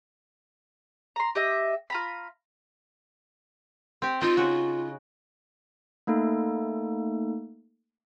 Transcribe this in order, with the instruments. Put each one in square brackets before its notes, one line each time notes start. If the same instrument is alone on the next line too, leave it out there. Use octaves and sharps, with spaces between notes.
[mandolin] A#5 C6
G4 D#5 E5
F4 A#5 B5
[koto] C4 G4
[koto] C4 D#4 [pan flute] F4
[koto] C#3 F#4
[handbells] A3 A#3 D#4 A4